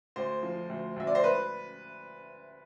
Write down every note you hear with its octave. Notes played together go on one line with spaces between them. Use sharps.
D2 C5
F3
D2
D2 E5
D5
C5
B4